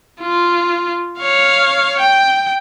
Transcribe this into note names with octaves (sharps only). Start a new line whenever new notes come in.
F4
C#5 F5
G5